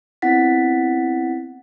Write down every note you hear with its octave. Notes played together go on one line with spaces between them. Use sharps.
B3 C4 E4 F#5 A6 B6